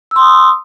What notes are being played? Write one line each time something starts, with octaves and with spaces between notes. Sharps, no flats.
C6 D#6 E6